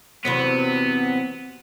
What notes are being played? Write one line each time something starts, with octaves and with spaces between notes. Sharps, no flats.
E2 C3 F#3 B3